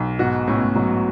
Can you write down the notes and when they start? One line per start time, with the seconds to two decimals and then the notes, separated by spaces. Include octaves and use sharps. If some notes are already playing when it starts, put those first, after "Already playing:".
Already playing: B1
0.19 G#2 B2 F#4
0.48 A2 C#4
0.56 B2
0.64 A2
0.75 G#2 B2 F#3